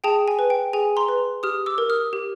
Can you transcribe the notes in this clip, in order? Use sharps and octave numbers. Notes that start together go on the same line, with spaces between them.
G#4 G5 A5
G#5
B4
G5
G#4 G#5
A#5 C6
B4
G4 D#6 F6
D6 E6
A#4
D#6 F6
G4